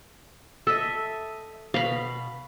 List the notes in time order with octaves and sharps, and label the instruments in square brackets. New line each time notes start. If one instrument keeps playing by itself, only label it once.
[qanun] A4 [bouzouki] D#5 E5
[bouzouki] B2 [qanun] F5 B5